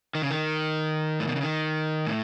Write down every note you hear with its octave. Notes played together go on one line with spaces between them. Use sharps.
D#3
C#3
D#3
A2
B2
C#3
D#3
A2